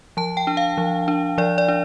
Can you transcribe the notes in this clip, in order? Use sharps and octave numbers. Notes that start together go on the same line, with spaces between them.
F3 A5
G5
D4
F5
F3
D4
F3 D5
D5
D4